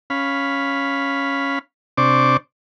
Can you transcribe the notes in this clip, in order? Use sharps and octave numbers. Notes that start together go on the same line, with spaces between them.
C#4 F5 B5
C3 D4 C5 D5 C#6 D6